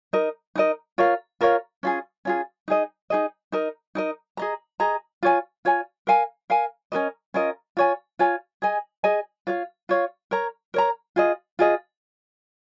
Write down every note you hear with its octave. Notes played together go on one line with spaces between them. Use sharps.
D#4 A#4 D#5
D#4 A#4 D#5
F4 A#4 C#5 F5
F4 A#4 C#5 F5
C#4 F4 G#4
C#4 F4 G#4
D#4 G#4 D#5
D#4 G#4 D#5
D#4 A#4 D#5
D#4 A#4 D#5
G#4 D#5 A#5
G#4 D#5 A#5
F4 C#5 G#5
F4 C#5 G#5
A#4 F5 G#5
A#4 F5 G#5
C#4 F4 A#4 D#5
C#4 F4 A#4 D#5
F4 C#5 G#5
F4 C#5 G#5
G#4 D#5 G#5
G#4 D#5 G#5
F4 C#5 F5
F4 C#5 F5
A#4 C#5 A#5
A#4 C#5 A#5
F4 G#4 D#5
F4 G#4 D#5